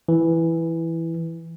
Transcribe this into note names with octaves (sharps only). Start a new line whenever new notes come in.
E3